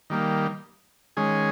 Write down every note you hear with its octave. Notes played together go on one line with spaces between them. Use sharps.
D#3 G3 A#3
D#3 G#3 C#4 G#4